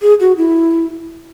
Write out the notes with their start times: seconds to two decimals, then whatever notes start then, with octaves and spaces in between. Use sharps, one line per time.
0.02 G#4
0.20 F#4
0.37 E4